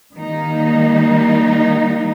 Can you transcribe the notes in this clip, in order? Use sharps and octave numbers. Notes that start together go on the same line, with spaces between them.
D#3 G3 A#3 D#4